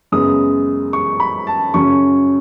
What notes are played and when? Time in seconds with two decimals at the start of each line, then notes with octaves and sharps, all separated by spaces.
0.12 F#2 C#3 G#3 B3 D#6
0.93 C#6
1.20 B5
1.47 A5
1.74 F#2 C#3 F#3 C#4 C#6